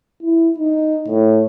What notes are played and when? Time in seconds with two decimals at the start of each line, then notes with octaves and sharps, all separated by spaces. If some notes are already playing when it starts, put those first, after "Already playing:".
0.23 E4
0.58 D#4
1.08 A2